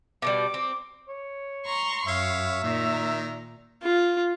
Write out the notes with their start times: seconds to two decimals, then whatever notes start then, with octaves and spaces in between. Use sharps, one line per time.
0.22 B2 F#3 G3 D6
0.54 C4
1.08 C#5
1.66 A#5 C6 C#6
2.08 F#2 C#5 E5 F5
2.64 A#2 D#3 A#5
3.83 F4